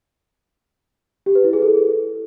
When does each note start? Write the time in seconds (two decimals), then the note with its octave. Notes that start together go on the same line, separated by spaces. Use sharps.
1.26 G4
1.35 B4
1.44 E4
1.53 G#4
1.62 A4